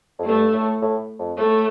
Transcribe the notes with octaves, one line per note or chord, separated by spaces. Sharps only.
F2
G2 A3
A2
A2
F2
A2 A3